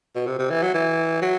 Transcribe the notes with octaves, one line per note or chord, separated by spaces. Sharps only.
B2
C3
C3
E3
F#3
E3
F#3